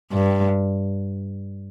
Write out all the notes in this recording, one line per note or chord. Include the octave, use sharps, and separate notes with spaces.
G2